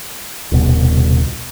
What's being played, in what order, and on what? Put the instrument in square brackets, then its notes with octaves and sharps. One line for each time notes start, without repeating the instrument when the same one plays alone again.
[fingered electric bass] D#1 C2 B2